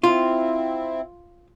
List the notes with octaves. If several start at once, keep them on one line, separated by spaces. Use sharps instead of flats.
C4 E4 F4